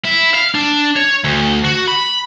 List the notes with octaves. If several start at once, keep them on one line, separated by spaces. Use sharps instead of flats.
E4
F5
D4
C#5
D2
F#4
B5